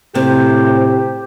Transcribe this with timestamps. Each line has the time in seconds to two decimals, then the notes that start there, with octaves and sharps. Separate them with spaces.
0.15 A2 C3 G4 C5